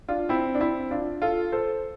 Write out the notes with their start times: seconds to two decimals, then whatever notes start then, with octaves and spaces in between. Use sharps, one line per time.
0.09 D4 F4
0.29 C4 E4
0.55 D4
0.61 C4 E4
0.91 D4 F4
1.22 F4 A4
1.52 A4 C5